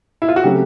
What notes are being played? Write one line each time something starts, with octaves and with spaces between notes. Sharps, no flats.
E4
F4
F#4
C#3 F#3 A3 C4 G4